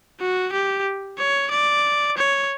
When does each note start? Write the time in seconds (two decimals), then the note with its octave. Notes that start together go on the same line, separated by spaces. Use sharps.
0.20 F#4
0.52 G4
1.18 C#5
1.51 D5
2.17 C#5